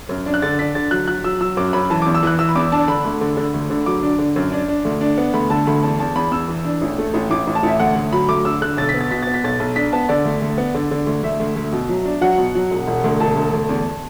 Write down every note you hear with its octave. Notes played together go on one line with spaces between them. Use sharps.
F#2
D4
F#6
D3 A6
D4 B6
D3 A6
F#3 F#6
F#3 F#6
F#3 E6
F#3 E6
F#2 D6
F#2 B5
E3 A5
E2 D6
E6
E3 F#6
E3 E6
B5
E2 D6
D4 A5
D3 B5
D2
D3
D3
D2
D3
F#3 D6
D4
D3
F#2
D4
D4
D2
D4
B3
D2 B5
D3 A5
D2 B5
E2 A5
E2 A5
E2 B5
E2 E6
E3
D4
A1
A3
A1
A1 D6
A1
A5
A1 E5
D2 F#5
D2
F#3 B5
D2 D6
D3 E6
D3 F#6
B1 A6
B6
B3
A6
B2 B6
B3 A6
B6
B1 A6
B1
D4 B6
B3 A5
D3 D5
D2
D2
B3
D3
D3
D2
D2 E5
D2
D2
B2
F#3
D4
F#3 F#5
B2
F#3
E1
E1
D2
E1 A5
D2
D2
E2